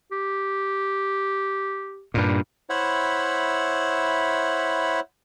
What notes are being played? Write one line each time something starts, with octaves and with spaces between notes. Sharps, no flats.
G4
G2 A#2
E4 C5 C#5 E5 F#5 B5